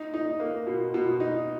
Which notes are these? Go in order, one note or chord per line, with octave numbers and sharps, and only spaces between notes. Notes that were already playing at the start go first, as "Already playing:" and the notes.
Already playing: D#4
D#4
A#3
B2
B2
D#4